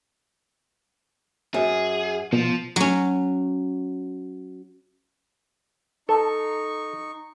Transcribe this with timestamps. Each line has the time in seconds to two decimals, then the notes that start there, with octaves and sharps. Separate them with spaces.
1.54 F#2 G#4
2.32 B2 F3
2.76 F#3 C#4
6.09 D#4 A4 C#6